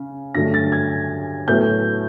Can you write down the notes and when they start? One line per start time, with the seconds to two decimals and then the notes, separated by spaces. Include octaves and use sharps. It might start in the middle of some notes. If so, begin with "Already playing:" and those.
Already playing: C#3
0.35 G2 D3 F#3 A3 A#6
0.54 A6
0.72 G#6
1.48 A2 F#3 B3 G6